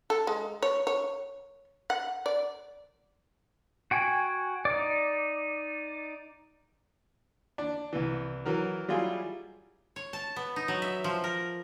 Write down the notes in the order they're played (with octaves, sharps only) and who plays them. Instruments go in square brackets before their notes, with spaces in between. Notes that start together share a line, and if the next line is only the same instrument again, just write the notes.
[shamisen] A4
G#3
C#5
C#5
F#5
D5
[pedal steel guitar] F#4 G5 G#5
D#4 D5
[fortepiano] D4
C2 E3
E3 F#3 A#4
F#3 G3 E4 F4 G#4
[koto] C#5
A5
B3
D#4
F#3
E5
F3
A#4